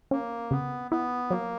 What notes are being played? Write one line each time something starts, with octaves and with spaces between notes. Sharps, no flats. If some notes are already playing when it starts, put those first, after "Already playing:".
A#3 C#4
C#3 B3
B3 E4
F#3 A#3